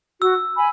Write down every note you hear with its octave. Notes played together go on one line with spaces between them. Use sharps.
F#4 E6
G#5 B5